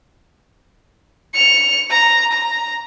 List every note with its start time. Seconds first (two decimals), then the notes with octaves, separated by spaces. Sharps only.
1.34 C#7 F7
1.90 A#5
2.32 A#5